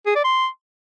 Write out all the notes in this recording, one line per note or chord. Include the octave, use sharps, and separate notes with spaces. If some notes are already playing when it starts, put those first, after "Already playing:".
G#4
D5
C6